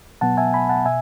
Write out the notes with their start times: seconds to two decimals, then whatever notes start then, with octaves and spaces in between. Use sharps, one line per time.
0.21 B2 F#3 B3 F#5 A5
0.37 E5 G#5
0.53 G#5 B5
0.69 F#5 A5
0.86 B2 E5 G#5